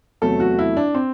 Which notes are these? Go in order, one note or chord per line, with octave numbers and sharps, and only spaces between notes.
E2 C3 F#3 A3 A4
F#4
E4
D4
C4